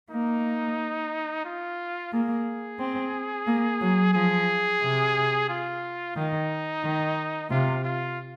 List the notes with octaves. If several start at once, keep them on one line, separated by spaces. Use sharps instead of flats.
A#3 D#4
F4
A#3 G#4
C4
A#3
F#3
F3 G#4
C3
F4
D#3 D#4
D#3
C3 F4
F4